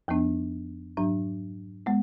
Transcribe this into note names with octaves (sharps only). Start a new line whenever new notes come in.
F2 F3 B3 D4
G#2 F#3 D4
G#3 B3